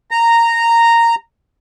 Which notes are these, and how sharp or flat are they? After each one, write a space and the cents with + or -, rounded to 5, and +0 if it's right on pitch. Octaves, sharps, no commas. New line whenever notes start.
A#5 -10